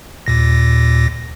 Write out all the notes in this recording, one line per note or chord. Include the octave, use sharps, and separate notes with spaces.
D#2 A#2 A#6